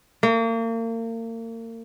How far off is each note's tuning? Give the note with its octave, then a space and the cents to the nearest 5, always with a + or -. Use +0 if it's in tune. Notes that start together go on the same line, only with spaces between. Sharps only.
A#3 -35